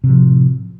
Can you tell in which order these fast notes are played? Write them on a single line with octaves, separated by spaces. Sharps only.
C3 A2 F3